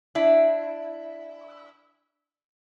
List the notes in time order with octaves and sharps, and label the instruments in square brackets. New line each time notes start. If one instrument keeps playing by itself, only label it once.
[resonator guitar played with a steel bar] D4 E4